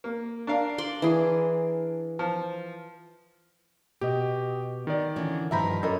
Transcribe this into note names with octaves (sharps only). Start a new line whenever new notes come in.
A#3
D4 A#4 F5
D5 C6
E3 G#4
F3
B2 G4 D#5
D#3 D5
D3 E3 C#4
G2 D#3 F3 E5 A#5 B5
F#2 A4 A#4 D#5